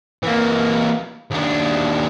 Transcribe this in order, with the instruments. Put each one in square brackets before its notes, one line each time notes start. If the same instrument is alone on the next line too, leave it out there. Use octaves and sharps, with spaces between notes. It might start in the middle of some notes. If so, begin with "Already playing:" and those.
[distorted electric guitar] E3 A#3
D#2 D4